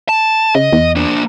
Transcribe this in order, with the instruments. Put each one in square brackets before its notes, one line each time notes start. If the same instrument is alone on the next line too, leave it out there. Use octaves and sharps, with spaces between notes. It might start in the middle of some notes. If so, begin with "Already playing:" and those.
[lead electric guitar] A5
[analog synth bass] C#3 [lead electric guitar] D#5
[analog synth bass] E2
[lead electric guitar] A#3 D4